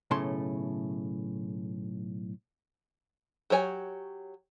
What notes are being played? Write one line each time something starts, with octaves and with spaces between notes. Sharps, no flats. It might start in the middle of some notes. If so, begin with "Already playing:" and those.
B1 A2 C#3 A3 A5 C6
F#3 G4 C#5 G#5